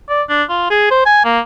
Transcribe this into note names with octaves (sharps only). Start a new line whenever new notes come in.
D5
D4
F4
G#4
C5
G#5
A#3